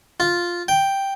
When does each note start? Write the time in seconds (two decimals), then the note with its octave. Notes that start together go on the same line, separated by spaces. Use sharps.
0.20 F4
0.68 G5